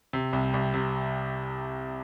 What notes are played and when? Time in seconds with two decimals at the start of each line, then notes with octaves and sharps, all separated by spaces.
0.13 C3
0.33 C2
0.54 C2
0.74 C3